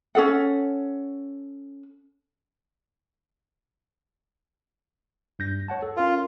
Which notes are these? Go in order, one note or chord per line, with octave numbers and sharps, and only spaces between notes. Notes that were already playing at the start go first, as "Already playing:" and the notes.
C#4 G#4 A4 F#5
G2 G6 A#6
C#5 F#5 A5
A4
C#4 F4 A#4